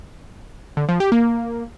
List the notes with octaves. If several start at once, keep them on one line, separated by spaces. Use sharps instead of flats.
D3
F3
G4
A#3